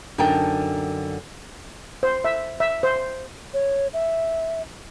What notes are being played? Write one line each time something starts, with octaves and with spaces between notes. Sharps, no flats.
F#2 D3 D4 D#4 A#4 G5
C5
E5
E5
C5
C#5
E5